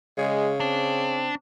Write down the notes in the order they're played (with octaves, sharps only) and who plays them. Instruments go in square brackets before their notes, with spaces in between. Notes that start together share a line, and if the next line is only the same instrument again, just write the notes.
[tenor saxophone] C#3 [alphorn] G#3
[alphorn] C4 [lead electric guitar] D4